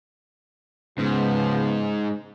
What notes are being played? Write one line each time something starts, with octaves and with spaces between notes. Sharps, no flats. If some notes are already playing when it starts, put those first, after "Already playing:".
G#2 C#3 F3 B3